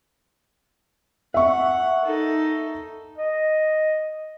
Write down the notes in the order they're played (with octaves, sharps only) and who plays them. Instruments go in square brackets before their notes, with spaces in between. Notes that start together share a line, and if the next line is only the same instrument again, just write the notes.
[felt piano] E5 C#6 [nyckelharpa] F#5
[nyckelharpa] D#4 A4
[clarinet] D#5